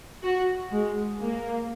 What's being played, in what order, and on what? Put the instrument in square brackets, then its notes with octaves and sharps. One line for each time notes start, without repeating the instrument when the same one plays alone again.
[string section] F#4
G#3
A#3